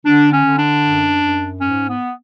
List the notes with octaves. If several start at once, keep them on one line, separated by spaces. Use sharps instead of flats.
D3 D4
C#4
D3
D4
F#2
F#2
G#2 C#4
B3